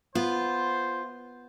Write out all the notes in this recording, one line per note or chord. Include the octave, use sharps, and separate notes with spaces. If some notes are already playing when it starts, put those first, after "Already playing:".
B3 F4 C5